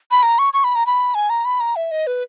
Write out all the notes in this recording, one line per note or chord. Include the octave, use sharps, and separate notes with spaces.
B5
A#5
C#6
C#6
B5
A#5
B5
G#5
A#5
B5
A#5
E5
D#5
B4